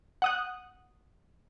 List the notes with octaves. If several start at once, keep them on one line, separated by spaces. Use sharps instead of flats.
F#5 D#6 F#6